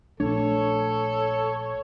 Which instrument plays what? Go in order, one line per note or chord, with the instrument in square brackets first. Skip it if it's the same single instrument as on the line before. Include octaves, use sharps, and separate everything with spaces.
[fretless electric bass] A#1 A3 D4 [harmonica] A4 [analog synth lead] C#5